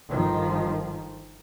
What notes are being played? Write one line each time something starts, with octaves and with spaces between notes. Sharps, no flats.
G1 D#3 F3